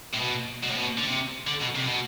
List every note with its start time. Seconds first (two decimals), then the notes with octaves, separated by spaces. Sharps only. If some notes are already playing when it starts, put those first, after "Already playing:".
0.14 A2
0.20 B2
0.64 B2
0.71 A2
0.77 B2
0.98 D3
1.05 C3
1.47 D3
1.62 B2
1.76 C3
1.87 B2